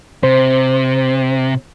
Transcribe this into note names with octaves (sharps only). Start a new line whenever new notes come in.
C3 C5